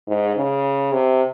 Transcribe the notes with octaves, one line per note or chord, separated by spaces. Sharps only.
G#2
C#3
C3